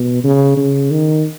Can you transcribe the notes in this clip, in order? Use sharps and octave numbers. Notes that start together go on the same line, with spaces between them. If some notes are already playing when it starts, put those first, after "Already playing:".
Already playing: B2
C#3
C#3
D#3